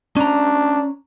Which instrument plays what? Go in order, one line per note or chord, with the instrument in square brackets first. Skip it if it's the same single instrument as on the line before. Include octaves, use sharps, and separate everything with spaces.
[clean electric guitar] C#4 A#5 [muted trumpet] D4